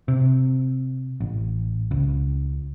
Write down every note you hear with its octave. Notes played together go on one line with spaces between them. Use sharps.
C3
A1
C#2